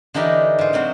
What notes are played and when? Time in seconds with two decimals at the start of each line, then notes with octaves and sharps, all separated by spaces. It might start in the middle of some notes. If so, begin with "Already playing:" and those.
0.14 D3 E3 D#4 G4 A#4
0.59 G#2 F4
0.73 C3 F#3 C4